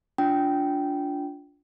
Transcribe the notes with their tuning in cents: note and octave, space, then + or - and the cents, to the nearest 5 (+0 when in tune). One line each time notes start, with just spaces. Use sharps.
D4 -25 F4 +0 G5 -15